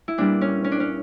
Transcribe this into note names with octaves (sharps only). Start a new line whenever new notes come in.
E4
A#2 G3 B3 D4
C#4
C#4
D4
C#4